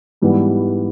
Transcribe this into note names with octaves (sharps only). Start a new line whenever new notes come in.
G#2 E3 G3 B3